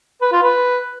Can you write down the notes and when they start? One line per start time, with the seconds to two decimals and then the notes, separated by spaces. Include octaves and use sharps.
0.21 B4
0.32 F4
0.43 B4